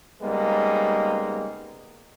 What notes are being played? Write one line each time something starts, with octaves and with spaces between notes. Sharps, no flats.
C#3 G3 G#3 A#3 B3 D#4